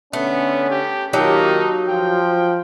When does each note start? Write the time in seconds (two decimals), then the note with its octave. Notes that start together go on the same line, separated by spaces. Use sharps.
0.13 D3 A3 B3 C#4
0.70 G4
1.13 D#3 F#3 A#3 D#4 F4 G4 A5
1.88 F3 G5